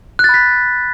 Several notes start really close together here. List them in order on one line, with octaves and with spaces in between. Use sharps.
F#6 A6 B5 B6